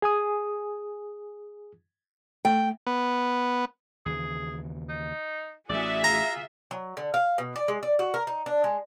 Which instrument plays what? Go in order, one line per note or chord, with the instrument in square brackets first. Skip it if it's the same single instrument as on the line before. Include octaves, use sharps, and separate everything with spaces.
[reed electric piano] G#4 G#5 D#6
[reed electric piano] A3 [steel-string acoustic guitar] G5
[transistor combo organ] B3
[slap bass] D#2 C#3 E3 [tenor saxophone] G#4
[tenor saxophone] D#4
[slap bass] A1 A3 [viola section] F#4 G#4 E5 [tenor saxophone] D5
[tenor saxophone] F4 [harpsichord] A#5
[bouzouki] F#3
D3
F5
B2
D5
G#3
D5
F#4
A#4
D#4
D4
G#3